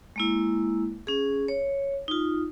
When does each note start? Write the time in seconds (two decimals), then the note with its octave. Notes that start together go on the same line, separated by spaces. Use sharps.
0.16 G#3 A#3 E4
1.07 C#4 G#4
1.48 C#5
2.08 D#4 F4